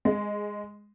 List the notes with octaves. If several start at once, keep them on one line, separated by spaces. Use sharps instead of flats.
G#3